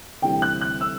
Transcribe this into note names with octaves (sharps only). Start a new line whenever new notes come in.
D2 C3 E3 G3 G5
F#6
F#6
E6